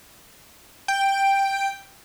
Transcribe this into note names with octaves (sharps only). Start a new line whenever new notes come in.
G5